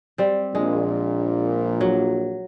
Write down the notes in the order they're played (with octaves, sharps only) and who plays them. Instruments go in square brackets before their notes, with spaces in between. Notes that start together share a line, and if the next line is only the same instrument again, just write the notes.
[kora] G3 C4
[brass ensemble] A#1 A#2 [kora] G#3
[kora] F#3